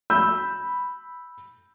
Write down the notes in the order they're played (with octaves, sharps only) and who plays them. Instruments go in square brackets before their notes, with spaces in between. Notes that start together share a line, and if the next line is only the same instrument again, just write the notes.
[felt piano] B5 E6 G6